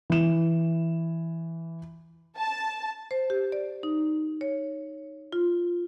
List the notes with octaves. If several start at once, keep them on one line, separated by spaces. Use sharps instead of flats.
E3 E7
A5
C5
G4
D5
D#4
C#5
F4